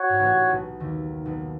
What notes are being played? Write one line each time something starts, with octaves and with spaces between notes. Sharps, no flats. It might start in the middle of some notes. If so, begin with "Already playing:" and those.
Already playing: F#4 C#5 F#5
G#2
A1 A2
B1 B2
D#2 D#3
B1 B2